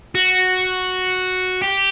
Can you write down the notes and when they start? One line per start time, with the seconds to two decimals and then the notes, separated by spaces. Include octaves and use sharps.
0.15 F#4
1.62 G4